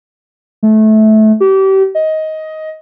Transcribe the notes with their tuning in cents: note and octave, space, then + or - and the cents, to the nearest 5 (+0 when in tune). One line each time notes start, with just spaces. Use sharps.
A3 -20
G4 -30
D#5 +15